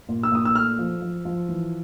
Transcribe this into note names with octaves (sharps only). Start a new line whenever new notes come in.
A#2
E6
A#2 D#6
E6
A3 F6
F3
F3
F3
E3